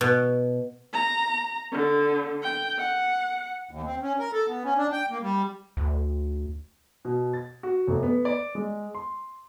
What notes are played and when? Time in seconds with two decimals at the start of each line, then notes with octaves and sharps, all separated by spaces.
0.01 B2
0.93 A#5
1.72 D3
2.43 G5
2.79 F#5
3.71 D#2
3.86 C4
4.02 C#4
4.19 A#4
4.33 A4
4.47 B3
4.64 C#4
4.78 D4
4.92 G5
5.10 A#3
5.22 G3
5.77 D2
7.05 B2
7.34 A6
7.63 F#4
7.87 F1
8.03 B3
8.25 D5
8.55 G#3
8.95 C6